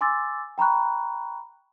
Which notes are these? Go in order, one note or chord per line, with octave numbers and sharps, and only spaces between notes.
G#5 C6 D6 E6 A6
G5 A#5 B5 C#6 F#6